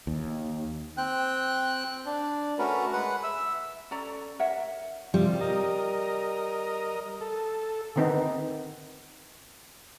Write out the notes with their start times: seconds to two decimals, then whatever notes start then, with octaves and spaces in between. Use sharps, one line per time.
0.07 D#2
0.97 C4 G5 F#6
2.06 D4
2.58 A3 C#4 F#4 A#4 B4
2.93 G#3 B4 F#5
3.23 E5 E6
3.91 C#4 A4 D5 A#5
4.39 A#4 C#5 E5 F#5
5.14 C3 F3 G3
5.41 A#4 D#5
7.21 A4
7.96 D3 D#3 B3 C4 D#4